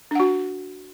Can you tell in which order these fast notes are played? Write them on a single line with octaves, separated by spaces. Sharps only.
D4 F#5 F#4